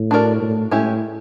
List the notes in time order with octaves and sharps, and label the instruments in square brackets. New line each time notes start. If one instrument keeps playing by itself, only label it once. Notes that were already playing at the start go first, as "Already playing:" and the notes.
Already playing: [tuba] A2
[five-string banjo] D4 F#4 A#4 D5
[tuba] A2
[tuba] A2 [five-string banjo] G#3 C#4 E4 G4